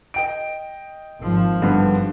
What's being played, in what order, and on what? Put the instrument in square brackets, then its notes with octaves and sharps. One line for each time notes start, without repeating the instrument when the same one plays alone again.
[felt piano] D#5 G5 D7
[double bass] G#1 F3
[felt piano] G2 D3 B3